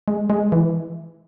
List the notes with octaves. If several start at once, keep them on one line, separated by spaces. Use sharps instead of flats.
G#3
G#3
E3